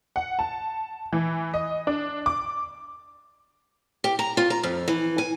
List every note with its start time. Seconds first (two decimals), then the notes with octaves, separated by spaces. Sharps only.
0.16 F#5
0.39 A5
1.13 E3
1.54 D#5
1.87 D4
2.26 D6
4.04 G4
4.19 A#5
4.37 F4
4.50 A#5
4.63 F2
4.88 E3
5.18 G#5